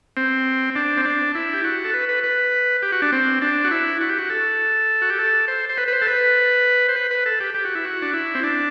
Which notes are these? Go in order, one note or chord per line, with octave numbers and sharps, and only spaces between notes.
C4
D4
C4
D4
E4
G4
F#4
A4
B4
B4
B4
G4
F#4
D4
C4
D4
F#4
E4
F#4
G4
F#4
A4
F#4
G4
A4
C5
C5
B4
B4
C5
A4
B4
C5
B4
B4
A4
G4
G4
F#4
E4
F#4
D4
E4
C4
D4